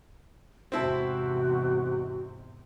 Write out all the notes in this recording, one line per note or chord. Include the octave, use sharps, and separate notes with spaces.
E2 G#2 C3 C4 E4 F#4 A5